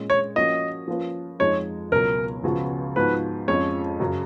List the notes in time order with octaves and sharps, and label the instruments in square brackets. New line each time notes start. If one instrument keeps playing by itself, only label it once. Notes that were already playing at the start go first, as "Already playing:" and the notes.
Already playing: [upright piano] A#2 G#3 C#4
[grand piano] C#5
[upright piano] F3 A#3 C#4 F#4 [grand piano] D#5
[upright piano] F3 A#3 C#4 F4 B4
[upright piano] F2 F3 G#3 D#4 [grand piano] C#5
[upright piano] C#2 B2 F#3 [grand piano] A#4
[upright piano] C#2 C#3 F3 B3 F#4
[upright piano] G#2 F3 B3 F#4 [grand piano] B4
[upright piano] F2 F3 G#3 C#4 [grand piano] C#5
[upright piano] F#2 C#3 F#3